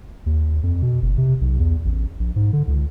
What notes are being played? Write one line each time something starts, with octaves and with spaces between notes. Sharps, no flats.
D#2
F2
B2
F#1
C3
B1
E2
A1
A#1
G#2
D3
C#2